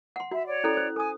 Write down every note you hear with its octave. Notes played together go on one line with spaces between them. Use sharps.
F#5 C6
F#4 E5
C#5 D5
C#4 E4 A4
C5
A4 G#5 D#6